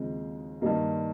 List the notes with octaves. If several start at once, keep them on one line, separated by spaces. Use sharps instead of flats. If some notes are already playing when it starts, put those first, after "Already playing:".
Already playing: D#2 C#3 F3 G#3 C4
G2 D#3 G3 A#3 D#5